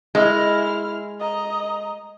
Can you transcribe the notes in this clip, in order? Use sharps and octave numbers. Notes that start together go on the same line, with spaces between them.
G#3 E4 F6
D#5 A#5